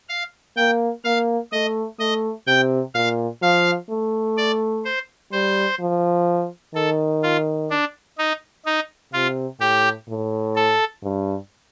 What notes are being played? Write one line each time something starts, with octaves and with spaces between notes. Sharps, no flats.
F5
A#3 G5
A#3 F5
A3 D#5
A3 D#5
C3 G5
A#2 F5
F3 F5
A3
D5
C5
G3 C5
F3
D#3 A4
F4
D4
D#4
D#4
C3 F4
A2 G4
A2
A4
G2